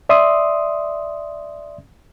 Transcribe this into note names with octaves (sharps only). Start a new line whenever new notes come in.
D5 E5 C6 D#6